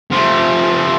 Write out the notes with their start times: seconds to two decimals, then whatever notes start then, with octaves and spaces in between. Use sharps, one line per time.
0.12 F3 A3